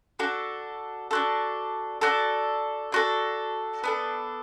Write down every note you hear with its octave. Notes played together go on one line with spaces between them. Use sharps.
D4 F#4 A4
D4 F#4 A4
D4 F#4 A4
D4 F#4 A4
B3 D4 A4